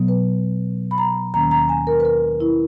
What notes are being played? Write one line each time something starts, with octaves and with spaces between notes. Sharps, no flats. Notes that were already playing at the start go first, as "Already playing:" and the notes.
Already playing: B2 F#3 B3
B4
B5
A#5
D#2 D#3 A#3 C#4 A#5
A#5
G#5
A#4
B4
A#4
E4